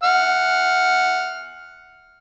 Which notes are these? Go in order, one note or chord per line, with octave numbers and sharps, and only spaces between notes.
F#5 F6